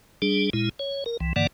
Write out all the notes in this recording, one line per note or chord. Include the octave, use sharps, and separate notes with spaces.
G3 D4 G#4
A#2 G#3 E4
C#5
A#4
C2 E3
G2 D3 E3 A#3 D5 F#5